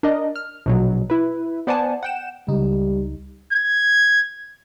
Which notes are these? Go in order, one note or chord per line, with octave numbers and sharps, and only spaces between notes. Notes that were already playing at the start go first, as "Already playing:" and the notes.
D4 A#4 D5 D#5
F6
A#1 B2 F#3
E4 B4
B3 C5 D5 F#5 G#5 A5
F#5 G5 E7
C#2 G3 D#4
G#6